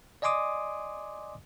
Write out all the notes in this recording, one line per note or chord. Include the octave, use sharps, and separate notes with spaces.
D5 D#5 G#5 C6 D6 D#6